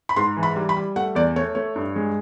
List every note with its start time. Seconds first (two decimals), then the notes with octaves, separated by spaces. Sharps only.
0.09 B5
0.16 G#2 C6
0.37 E3
0.43 B5
0.56 G3
0.69 B5
0.76 G3
0.96 A3 F#5
1.15 E2 D5
1.36 A3 C#5
1.55 A3 C#5
1.76 G2
1.96 G#3